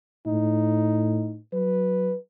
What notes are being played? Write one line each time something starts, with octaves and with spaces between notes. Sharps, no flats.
A2 D#4
F#3 B4